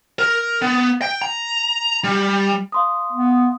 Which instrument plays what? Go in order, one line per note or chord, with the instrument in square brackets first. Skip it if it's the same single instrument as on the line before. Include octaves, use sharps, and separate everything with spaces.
[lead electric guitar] A#4
B3
G5
A#5
G3
[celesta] F5 C6 D#6
[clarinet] B3